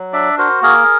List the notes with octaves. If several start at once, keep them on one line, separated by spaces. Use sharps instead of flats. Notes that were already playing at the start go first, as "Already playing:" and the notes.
Already playing: F#3
D4 D5 E5
F#4 A#4 C5
A#3 G#4 A#4